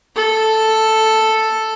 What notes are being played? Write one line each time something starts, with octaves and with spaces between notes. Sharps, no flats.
A4